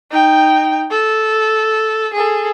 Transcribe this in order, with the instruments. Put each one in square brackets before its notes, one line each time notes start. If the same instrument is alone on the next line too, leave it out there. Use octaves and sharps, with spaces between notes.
[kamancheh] D#4 G5
A4
G#4 A4